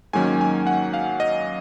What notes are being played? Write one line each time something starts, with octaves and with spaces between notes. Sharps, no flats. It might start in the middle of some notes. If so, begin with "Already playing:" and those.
G#2 D#3 F#3 A#3 C#4 G#5
G#5
F#5
F5
D#5